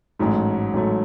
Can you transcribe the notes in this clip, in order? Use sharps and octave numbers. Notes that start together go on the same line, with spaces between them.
A1 G#2 F#3 A3
A1 G#2 F#3 A3